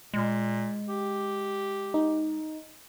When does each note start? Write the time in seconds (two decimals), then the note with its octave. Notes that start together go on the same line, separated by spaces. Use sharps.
0.14 A#2 G#3
0.89 G4
1.94 D#4